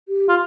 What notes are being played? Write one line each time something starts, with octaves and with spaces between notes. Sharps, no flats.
G4
F4